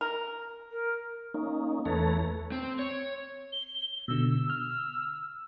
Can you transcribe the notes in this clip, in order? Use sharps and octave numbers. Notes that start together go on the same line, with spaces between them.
A#4
A#4
A#3 C#4 D#4
E2 A3 A4 B4 C#5 A#5
C4
C#5
G7
B2 D3 E6
E6 F6